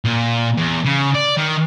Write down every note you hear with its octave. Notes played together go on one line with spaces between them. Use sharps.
A#2
E2
C#3
D5
D#3